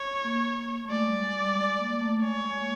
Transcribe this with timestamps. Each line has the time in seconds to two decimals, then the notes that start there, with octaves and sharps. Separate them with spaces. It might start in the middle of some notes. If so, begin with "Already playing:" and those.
Already playing: C#5
0.24 A#3
0.85 A3
0.90 G#3 D5
1.07 G3
1.23 G#3
1.40 G3
1.57 G#3
1.79 A#3
1.93 A#3
2.01 A3
2.23 G#3 C#5
2.45 G#3
2.60 A#3